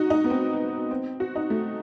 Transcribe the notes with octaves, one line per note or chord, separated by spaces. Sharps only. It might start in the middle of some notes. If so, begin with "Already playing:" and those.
Already playing: D#4 F#4
D#4
B3
C4
C4
F#4
D#4
A3